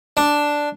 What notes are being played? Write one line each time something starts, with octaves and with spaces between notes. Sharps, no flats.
D4